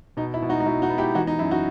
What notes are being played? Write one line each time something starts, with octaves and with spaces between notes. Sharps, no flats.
B2 D#4
E4
B2
D#4 F#4
D#4
B2 E4
D#4 F#4
B3
E4 G4
E3 D#4 F#4
D#4
F#2 E4
D#4 F#4